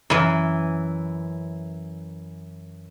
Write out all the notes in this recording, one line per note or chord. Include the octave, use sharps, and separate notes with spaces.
F#2 E3